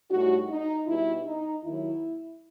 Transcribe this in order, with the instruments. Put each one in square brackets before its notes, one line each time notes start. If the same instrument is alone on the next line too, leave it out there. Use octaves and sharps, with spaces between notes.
[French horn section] A2 G3 D#4 F#4
D#4
B2 G3 D#4 E4
D#4
D#2 D#3 F#3 E4